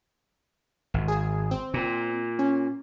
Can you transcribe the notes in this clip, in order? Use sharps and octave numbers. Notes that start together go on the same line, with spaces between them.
G#1
G#4
C4
A#2
C#4